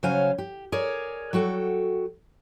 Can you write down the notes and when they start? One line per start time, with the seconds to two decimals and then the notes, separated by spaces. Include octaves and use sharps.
0.03 C#3 F#3 C5 C#5 F5 G#5
0.38 G4
0.72 G#4 A#4 C#5 D5
1.33 F#3 F#4 A4 G5